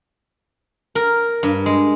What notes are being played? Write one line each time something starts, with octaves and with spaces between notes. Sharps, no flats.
A#4
G2
G#3